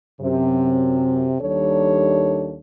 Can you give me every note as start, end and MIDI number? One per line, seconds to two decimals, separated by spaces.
0.21 1.35 42
0.21 1.35 48
1.41 2.58 39
1.41 2.58 51
1.41 2.58 55
1.41 2.58 62
1.41 2.58 69
1.41 2.58 73